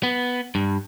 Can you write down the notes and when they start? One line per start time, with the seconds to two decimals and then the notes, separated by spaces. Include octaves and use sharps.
0.03 B3
0.55 G2